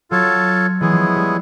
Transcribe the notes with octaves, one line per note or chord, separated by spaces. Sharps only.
F#3 F4 A4 C#5
E3 G#3 B3 E4 G#4 C#5
F3
G3